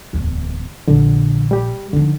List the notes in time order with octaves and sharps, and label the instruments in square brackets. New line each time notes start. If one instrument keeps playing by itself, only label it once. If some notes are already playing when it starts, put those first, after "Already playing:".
[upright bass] D1 E2
[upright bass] A#1 [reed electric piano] D3
[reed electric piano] G3 G4
[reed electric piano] D3 [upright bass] F3 D#4